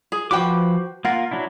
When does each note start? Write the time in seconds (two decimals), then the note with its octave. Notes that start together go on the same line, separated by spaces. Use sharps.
0.12 G#4
0.31 F3 F#4 B4 C5 G5 D6
1.05 A#3 F4 A#4 F#5
1.31 F#3 D4 E4